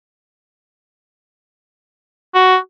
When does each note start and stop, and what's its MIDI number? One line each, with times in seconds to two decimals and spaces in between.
2.35 2.57 66